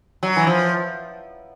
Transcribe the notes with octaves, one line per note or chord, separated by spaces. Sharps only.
F#3
E3
F3